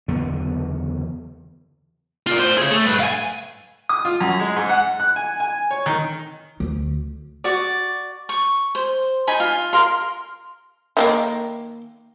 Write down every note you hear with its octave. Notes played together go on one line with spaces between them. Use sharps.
F#1 E2 D3 B3
F4 D5
A2 C5
G#4 C#5
A3
G2 B4
F5 G#5
D#6
F4
F#2
G#3
G#2
F#5
F#6
G#5
G#5
C#5
D#3
D2
F#4 D5
C#6
C5
D#4 G#5 B5
F4
A#4 F5 C6
D#3 G3 A#3